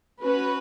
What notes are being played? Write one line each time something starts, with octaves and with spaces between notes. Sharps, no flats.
C#4 F#4 B4